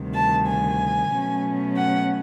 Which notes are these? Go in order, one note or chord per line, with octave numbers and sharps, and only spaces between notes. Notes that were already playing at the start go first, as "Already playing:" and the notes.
Already playing: D2 C3 D#3 G3
A5
G#5
B2 F#3 A3 C#4
F#5